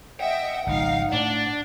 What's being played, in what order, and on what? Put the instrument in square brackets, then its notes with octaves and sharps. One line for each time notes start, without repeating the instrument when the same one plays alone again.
[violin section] D#5 E5 G5 [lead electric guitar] F#5
[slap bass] G#1 C#2 F3 [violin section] D#4 F5
[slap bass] A2 A3 [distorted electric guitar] D4 [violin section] D5